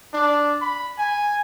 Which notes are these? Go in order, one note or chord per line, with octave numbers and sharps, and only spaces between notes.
D4
B5
G#5